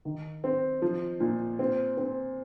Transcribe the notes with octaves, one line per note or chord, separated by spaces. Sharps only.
D#3
C4
F3
A#2
C4
C4